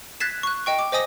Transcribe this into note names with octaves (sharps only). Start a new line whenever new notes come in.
F#6 G#6 A6 B6 C7 E7
C#6 F#6
D#5 G5 C#6
D6
C5 D#5 G#5 D#6 A#6